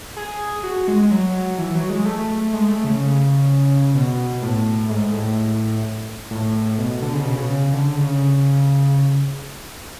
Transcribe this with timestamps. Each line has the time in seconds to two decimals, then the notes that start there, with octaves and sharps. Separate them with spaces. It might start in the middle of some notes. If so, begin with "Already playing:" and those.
0.17 G#4
0.64 F#4
0.88 G#3
1.02 G#3
1.11 F#3
1.58 E3
1.75 F#3
1.90 G#3
2.05 A3
2.53 G#3
2.68 A3
2.84 C#3
3.95 B2
4.42 A2
4.90 G#2
5.13 A2
6.31 A2
6.78 B2
7.02 D3
7.14 C#3
7.25 B2
7.36 C#3
7.73 D3
7.97 C#3